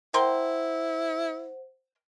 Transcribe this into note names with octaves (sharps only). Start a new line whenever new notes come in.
E4 A#4 C5 F#5 G5 C6